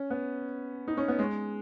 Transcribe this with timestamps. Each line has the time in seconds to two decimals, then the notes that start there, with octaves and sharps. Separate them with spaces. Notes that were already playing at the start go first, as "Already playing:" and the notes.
Already playing: C#4
0.10 B3
0.88 D#4
0.97 C#4
1.08 B3
1.19 G#3